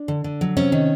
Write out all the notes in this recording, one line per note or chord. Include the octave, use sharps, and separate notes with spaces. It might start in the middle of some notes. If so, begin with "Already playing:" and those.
Already playing: D4 D5
D3
D3
F#3
C3 C#4 C#5
D#3